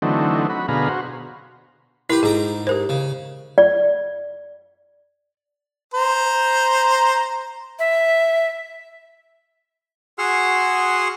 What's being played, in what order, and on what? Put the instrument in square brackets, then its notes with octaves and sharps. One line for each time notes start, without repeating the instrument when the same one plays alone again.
[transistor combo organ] D3 E3 F#3 A3 C4 D#4
F#4 B5
B2 D3 G#4 F5 A#5 B5
F#4 C5
[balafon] E4 A#4 [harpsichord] G4 B4
[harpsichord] G#2 A#5 D6 [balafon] G#4
[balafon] G4 A#4 C5
[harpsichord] C#3
[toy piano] D5
[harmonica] C5 A#5
[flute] E5
[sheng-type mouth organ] F#4 G#4 F#5 C6 E6 F6